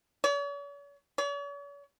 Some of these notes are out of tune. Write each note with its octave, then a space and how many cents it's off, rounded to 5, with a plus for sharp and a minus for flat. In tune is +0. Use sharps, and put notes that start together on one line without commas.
C#5 +45
C#5 +45